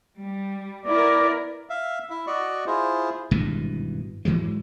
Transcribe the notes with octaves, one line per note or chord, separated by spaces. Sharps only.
G3
B3 E4 A#4 D5
E5 F5
E4 E5
F#4 D5 D#5 C#6
E4 F4 G#4 C5
G#1 G2 B2 E3
G#2 E3 F#3 G#3